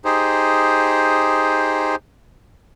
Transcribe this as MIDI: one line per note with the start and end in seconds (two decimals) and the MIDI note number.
0.05 1.96 63
0.05 1.96 67
0.05 1.96 68
0.05 1.96 72